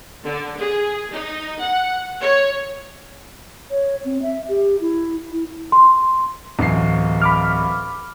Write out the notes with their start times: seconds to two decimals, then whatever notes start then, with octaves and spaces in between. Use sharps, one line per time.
0.24 D3
0.59 G#4
1.12 D#4
1.62 F#5
2.21 C#5
3.70 C#5
4.05 C4
4.22 E5
4.48 G4
4.80 E4
5.31 E4
5.72 C6
6.59 D1 A1 C7
7.22 B5 D6 F6